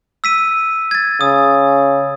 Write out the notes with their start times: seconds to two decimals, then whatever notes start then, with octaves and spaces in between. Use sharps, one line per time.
0.24 E6 B6 D#7
0.91 G#6 A6
1.21 C#3 D#6